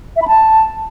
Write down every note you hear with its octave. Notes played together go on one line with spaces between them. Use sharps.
E5
B5
A5